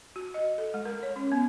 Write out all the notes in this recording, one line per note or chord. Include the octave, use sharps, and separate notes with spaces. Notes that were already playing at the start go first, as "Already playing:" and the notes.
F#4
D#5
A4
G#3
A#4
C#5
C#4
B3